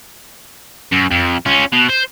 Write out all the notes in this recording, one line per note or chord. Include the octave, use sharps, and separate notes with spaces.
F#2
F2
C#4 F4
B2
C5